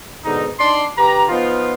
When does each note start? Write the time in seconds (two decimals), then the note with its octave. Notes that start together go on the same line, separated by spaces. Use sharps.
0.24 G#2 B2 D3 D#4
0.59 D4 D#4 D5 C6
0.97 D3 G4 B4 A#5
1.29 F3 B3 D#4 F4